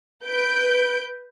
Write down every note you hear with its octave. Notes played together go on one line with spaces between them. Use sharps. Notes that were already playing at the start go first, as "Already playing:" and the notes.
B4 G6 D7